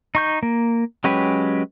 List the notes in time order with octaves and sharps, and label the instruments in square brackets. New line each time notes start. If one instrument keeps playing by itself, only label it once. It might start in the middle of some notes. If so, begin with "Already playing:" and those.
[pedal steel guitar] D#4 C#6 G6
A#3
F#3 G#3 C#4 G4 B4